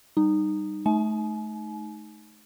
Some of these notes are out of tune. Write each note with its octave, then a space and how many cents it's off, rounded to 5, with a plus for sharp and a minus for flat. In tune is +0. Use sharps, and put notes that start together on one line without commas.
G3 +0 D#4 -15
A3 -30 D#4 +0 G#5 +40